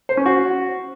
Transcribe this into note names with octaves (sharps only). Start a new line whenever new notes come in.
C5
C#4
F#4